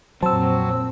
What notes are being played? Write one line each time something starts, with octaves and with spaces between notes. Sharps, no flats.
F2 A#2 F#3 C4 C5 A5 E6